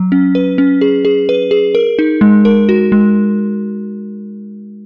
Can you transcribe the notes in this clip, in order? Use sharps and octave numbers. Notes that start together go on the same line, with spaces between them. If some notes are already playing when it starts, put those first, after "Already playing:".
Already playing: F#3
C#4
B4
C#4
G#4
G#4
B4
G#4
A#4
D#4
G#3
A#4
F#4
G#3